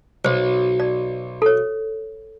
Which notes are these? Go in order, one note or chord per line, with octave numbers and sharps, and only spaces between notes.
B1 C5
D5
A4 C#5